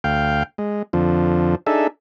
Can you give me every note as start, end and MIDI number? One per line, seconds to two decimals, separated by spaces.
0.04 0.43 38
0.04 0.43 77
0.04 0.43 79
0.58 0.83 56
0.93 1.55 41
0.93 1.55 50
0.93 1.55 53
1.67 1.87 62
1.67 1.87 63
1.67 1.87 68
1.67 1.87 69
1.67 1.87 76